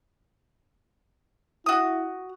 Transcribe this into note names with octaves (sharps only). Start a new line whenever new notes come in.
E4 F#4 D#6